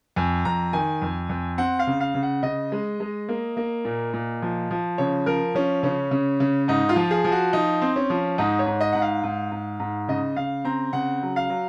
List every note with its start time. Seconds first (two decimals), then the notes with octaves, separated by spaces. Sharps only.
0.16 F2 G#5
0.45 F2 A#5
0.73 D#3 G#5
1.02 F2
1.29 F2
1.58 C4 F#5
1.79 F5
1.87 C#3
2.00 F5
2.14 C#3
2.23 F#5
2.43 C#3 D#5
2.72 G#3
3.00 G#3
3.29 A#3
3.57 A#3
3.85 A#2
4.13 A#2
4.42 F3
4.71 F3
4.98 C#3 C#5
5.26 F3 A#4
5.55 F3 C#4
5.83 C#3 C#4
6.11 C#3
6.40 C#3
6.68 G#2 D#4
6.89 F4
6.96 F3
7.11 G#4
7.24 F3
7.32 F#4
7.53 F3 D#4
7.82 C4
7.96 C#4
8.10 F3
8.38 G#2 D#4
8.59 C#5
8.66 G#2
8.81 D#5
8.92 G#2 F#5
9.02 F5
9.23 G#2
9.51 G#2
9.80 G#2
10.08 C#3 D#5
10.36 C#3 F5
10.65 C4 A#5
10.93 C#3 F#5
11.22 F#3
11.36 F5
11.50 F#3